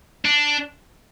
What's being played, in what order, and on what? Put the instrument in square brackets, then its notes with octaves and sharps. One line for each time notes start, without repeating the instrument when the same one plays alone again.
[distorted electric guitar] D4